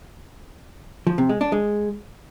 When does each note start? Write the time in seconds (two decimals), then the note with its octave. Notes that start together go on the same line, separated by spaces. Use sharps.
1.07 F3
1.18 C3
1.29 G#3
1.41 D4
1.52 G#3